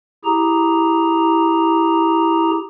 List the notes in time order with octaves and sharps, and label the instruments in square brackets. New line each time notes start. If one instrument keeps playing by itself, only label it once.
[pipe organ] E4 G4 G#4 A#5